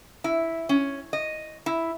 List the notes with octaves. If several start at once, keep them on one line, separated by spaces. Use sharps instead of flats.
E4
C#4
D#5
E4